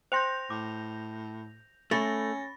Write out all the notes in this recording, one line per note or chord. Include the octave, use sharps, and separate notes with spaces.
C5 G5 C6 G6 A#6 F7
A2 D6
A3 C#4 B5 C#6 A6 A#6